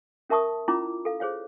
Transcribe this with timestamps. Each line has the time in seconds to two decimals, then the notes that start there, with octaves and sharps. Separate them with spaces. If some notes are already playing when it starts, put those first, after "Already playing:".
0.30 C#4 A#4 E5 A5 C#6 D#6
0.68 C#4 E4 F4 A#5 B5 D6
1.05 A4 F5
1.20 G#4 C5 C#5 F5